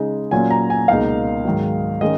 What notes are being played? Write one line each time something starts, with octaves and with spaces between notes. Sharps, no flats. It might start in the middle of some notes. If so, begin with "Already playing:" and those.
Already playing: C#3 G#3 D#4
A#2 F#3 C#4 F4 G#5
A#5
G#5
C#2 B2 A#3 D#4 F5
G#2 D#3 F#3
D#3 G#3 C#4 D#5